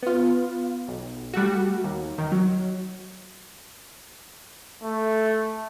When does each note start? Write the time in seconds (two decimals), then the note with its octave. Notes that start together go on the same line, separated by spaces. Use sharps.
0.03 B3 F4
0.88 B1
1.34 G3 A3 F#4
1.84 D#2
2.18 D#3
2.32 F#3
4.83 A3